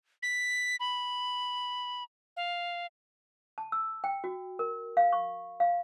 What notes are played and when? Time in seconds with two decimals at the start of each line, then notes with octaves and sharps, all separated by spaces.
0.23 B6
0.80 B5
2.37 F5
3.58 A5
3.72 E6
4.04 G5
4.24 F#4
4.59 A#4
4.97 F5
5.13 C#6
5.60 F5